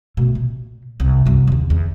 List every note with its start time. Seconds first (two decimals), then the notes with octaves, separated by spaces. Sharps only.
0.17 B2 A3
0.35 A#2
1.00 C2
1.26 C2 F#2
1.47 D#2 D3
1.70 E2